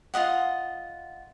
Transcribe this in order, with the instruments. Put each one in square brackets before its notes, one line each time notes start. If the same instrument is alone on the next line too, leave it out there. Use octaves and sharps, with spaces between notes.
[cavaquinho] F4 F#4 D#5 F#5